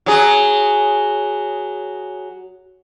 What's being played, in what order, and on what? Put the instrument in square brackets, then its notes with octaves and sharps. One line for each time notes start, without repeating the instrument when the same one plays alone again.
[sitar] F#3 G#4